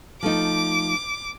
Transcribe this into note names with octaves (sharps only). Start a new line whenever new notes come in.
F3 A3 D#4 D6